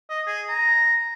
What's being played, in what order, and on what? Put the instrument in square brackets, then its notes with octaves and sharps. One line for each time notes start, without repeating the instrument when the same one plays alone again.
[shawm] D#5
G#4
A#5